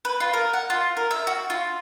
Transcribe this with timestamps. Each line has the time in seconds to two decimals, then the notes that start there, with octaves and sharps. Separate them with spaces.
0.05 B4
0.20 F4
0.33 A#4
0.53 F#5
0.70 F4
0.97 A#4
1.11 E5
1.27 F#4
1.50 F4